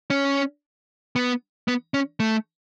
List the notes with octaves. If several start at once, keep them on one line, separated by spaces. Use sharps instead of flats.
C#4
B3
B3
C#4
A3